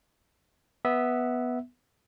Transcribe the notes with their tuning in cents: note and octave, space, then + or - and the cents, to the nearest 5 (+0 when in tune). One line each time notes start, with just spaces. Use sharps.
B3 +0 E5 -15